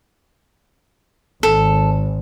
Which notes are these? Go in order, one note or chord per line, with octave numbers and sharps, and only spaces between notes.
G#1 A4